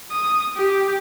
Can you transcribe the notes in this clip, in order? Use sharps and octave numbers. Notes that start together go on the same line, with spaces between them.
D#6
G4